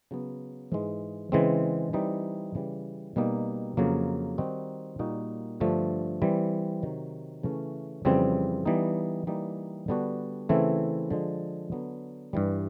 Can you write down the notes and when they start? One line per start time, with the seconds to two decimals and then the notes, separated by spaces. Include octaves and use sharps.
0.11 C#3 F#3 B3
0.72 G#2 E3 G#3
1.32 C#3 E3 G#3 C4
1.93 E3 G3 C4 D#4
2.55 C#3 E3 G3
3.16 B2 G3 A#3 D#4
3.77 F2 C#3 F#3 A#3
4.38 D#3 G3 C4 D#4 F#4
4.99 A#2 G3 A#3 D#4 F#4
5.60 G2 D3 F3 A3
6.22 E3 G3 C4
6.83 C3 D#3 F#3
7.43 C#3 E3 A3 C#4
8.05 F2 C#3 E3 G3 C4
8.66 E3 G3 B3 D#4
9.27 E3 G3 A#3 D#4
9.88 D3 G3 B3 D4 F#4
10.49 C#3 E3 A3 C4 E4
11.11 D3 F3 G#3
11.72 D3 F#3 B3
12.33 G2 E3 G3